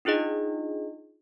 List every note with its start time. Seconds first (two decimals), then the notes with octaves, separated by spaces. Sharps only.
0.05 D4 D#4 F4 G#4 D#5